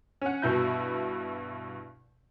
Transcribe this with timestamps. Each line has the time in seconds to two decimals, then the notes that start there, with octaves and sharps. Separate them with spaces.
0.21 C#4 F#5
0.42 G2 B2 E4 G6